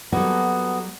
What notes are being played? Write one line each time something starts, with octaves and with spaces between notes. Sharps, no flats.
F#3 G3 A#3 B3 F#4 A4